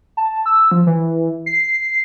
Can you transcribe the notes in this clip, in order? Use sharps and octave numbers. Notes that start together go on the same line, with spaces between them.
A5
E6
F3
E3
C7